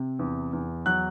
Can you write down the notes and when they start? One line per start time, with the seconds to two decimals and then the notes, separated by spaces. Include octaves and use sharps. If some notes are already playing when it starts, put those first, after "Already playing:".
Already playing: C3
0.19 E2
0.53 E2
0.86 F#3 F#6